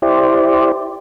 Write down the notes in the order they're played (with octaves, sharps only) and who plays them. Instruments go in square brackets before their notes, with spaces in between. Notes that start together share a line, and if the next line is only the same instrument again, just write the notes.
[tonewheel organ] E4 G4 C5 D5